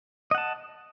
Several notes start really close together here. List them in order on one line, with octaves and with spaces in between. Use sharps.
D#5 F#5 A5